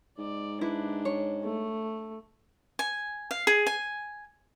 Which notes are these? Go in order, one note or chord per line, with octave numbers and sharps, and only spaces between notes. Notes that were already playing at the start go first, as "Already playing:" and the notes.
G#2 D5
D4 E4 B4
C#5
A3
G#5
F5
G#4
G#5